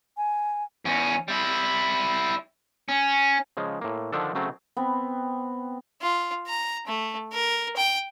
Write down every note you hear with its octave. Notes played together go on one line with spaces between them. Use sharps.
G#5
E2 C#4
G3 E4
C#4
C#3 F3 G#3
A2 A#3
D3 D#3 F3 D4 A4
C#3 F#3 A3 C4
B3 C4
F4
A#5
A3
A#4
G5